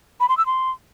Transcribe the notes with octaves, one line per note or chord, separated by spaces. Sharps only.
B5
C6
E6
C6